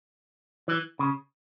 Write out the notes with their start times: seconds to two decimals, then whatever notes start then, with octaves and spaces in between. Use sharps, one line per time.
0.68 E3
0.99 C#3